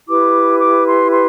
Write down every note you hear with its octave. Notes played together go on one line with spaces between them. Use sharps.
E4 G4 B4 D6
D6
C6
C6